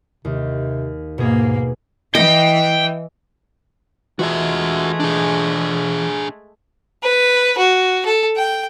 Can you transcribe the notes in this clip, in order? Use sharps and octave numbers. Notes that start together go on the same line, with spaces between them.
D#2 C3
G#2 B2 A#3 G#4
E3 D#5 G5
E3 G#3 A3 F4 F#4 D#5 E5
D4 G#4
B4
F#4
A4
G5